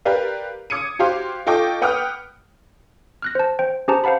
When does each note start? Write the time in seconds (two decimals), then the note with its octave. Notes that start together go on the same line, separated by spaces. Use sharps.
0.05 G4 A#4 B4 D5 F5
0.70 D6 D#6 G#6 C#7 D#7
0.99 F#4 G4 C5 F5 C6 D6
1.46 F4 A4 D#5 G5 C#6 D6
1.82 B4 F#5 G5 D6 D#6 F6
3.22 F6 F#6 A#6
3.35 C5 A5
3.59 C5 G5
3.88 C#4 G4 G#4 C5 A5 A#5
4.04 C5 F5 F#5 A5 B5